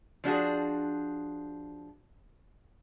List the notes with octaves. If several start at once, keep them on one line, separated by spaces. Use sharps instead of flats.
F3 D4 F#4 G#4